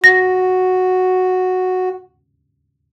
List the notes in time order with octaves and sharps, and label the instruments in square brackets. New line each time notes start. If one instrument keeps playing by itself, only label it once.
[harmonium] F#4 [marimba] A#6